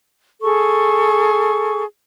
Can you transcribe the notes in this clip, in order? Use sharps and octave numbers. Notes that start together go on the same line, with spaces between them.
G#4 A4 C#6